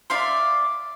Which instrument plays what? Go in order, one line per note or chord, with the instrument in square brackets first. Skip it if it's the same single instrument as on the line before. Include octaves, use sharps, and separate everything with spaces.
[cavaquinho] D5 E5 F5 C6